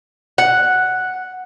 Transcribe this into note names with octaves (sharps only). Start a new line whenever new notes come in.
F#5